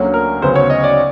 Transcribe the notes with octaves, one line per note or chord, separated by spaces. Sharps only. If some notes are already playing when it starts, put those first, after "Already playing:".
Already playing: D2 D3 F#3 A#3 C#4
A#4
D2 C#3 F#3 B3 C5
C#5
D#5
D5